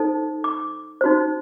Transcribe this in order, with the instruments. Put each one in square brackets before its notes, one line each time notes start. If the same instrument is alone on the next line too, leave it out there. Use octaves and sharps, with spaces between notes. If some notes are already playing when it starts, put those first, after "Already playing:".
Already playing: [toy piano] D#4 A4 C5
D6
D#4 F#4 C5